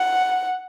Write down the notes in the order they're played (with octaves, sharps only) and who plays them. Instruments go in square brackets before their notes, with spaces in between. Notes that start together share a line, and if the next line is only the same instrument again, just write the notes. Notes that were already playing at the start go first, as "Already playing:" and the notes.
Already playing: [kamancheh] F#5